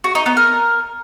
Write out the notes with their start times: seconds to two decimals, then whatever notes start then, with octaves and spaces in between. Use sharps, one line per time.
0.04 F#4
0.15 D#4
0.26 B3
0.37 A#4